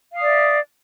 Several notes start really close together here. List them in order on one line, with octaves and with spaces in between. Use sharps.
F5 D#6 D5 E5